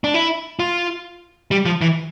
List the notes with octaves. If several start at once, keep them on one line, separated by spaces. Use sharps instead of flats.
D4
E4
F4
G3
F3
E3